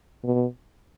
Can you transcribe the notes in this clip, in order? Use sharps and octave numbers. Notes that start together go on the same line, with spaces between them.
B2